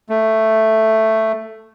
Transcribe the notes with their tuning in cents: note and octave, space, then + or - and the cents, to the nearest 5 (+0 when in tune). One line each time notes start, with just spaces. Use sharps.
A3 +5